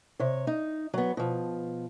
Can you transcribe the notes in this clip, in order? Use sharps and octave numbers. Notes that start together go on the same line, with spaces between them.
C3 C#5
D#4
F#3 B3
B2 F3